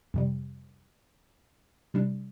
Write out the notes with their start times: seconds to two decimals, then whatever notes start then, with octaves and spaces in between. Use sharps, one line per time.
0.14 F2 C3 G3
1.94 C3 G3 D4